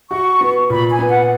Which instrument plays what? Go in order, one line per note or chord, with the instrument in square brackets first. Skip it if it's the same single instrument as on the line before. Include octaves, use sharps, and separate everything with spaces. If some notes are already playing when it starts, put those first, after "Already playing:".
[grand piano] F#4 [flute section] C#6
[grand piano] B3
[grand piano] A#2 [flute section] B5
[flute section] G#5
[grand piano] B3
[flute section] F#5